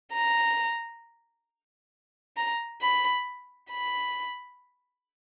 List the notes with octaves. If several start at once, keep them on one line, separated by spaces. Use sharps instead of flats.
A#5
A#5
B5
B5